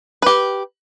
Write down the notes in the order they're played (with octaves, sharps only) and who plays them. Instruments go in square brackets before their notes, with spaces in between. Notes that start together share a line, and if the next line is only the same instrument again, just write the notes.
[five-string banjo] G4 B4